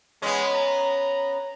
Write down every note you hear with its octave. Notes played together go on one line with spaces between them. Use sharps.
G#3 B3 C#4
A#5